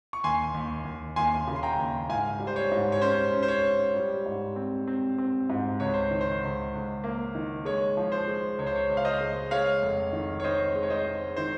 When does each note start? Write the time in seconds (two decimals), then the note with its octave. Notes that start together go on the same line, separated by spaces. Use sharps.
0.13 C#6
0.24 D#2 G#5 C6
0.54 D#2
0.85 D#2
1.16 D#2 G#5 C6
1.48 C#3
1.56 C6
1.63 G5 A#5
1.78 D#2
2.09 G#2 F5 G#5
2.40 G3
2.47 C5
2.56 C#5
2.72 G#2
2.92 C#5
3.01 C#4 C5
3.33 C#4
3.43 C5
3.48 C#5
3.64 C#4
3.95 G3
4.26 G#2
4.56 C4
4.87 C4
5.18 C4
5.50 G#2
5.80 C#2 C#5
5.94 C5
6.11 D#3
6.21 C5
6.43 C#2
6.73 C#2
7.04 A#3
7.35 D#3
7.65 G#3 C#5
7.97 F3
8.12 C5
8.27 G#3
8.58 C#2 C#5
8.66 C5
8.76 C#5
8.89 C#2
8.97 F5
9.05 C5 D#5
9.21 G#3
9.51 G#3 C#5 F5
9.82 F1
10.13 D#3
10.40 C#5
10.44 D#3 C5 D#5
10.75 G#3
10.83 C#5
10.90 C5 D#5
11.06 G#3
11.37 D#3 C5